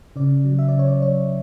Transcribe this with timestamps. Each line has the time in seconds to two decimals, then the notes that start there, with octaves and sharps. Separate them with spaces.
0.16 C#3 D5
0.45 F#3
0.59 E5
0.68 D5
0.74 C#3
0.79 C#5
0.88 D5
1.02 F#3 C#5